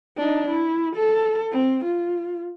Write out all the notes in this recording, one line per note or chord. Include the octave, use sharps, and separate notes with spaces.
D4 D#4
E4
A4
C4
F4